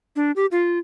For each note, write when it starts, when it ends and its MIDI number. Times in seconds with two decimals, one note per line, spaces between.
0.16 0.32 62
0.36 0.46 67
0.52 0.79 65